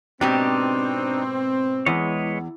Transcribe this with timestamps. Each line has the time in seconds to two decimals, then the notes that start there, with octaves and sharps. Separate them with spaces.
0.21 G#2 B2 C4 D4 D#4 G4
1.86 E2 G#3 B4 C#5